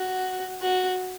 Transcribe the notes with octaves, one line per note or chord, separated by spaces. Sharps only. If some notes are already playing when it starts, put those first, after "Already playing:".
Already playing: F#4
F#4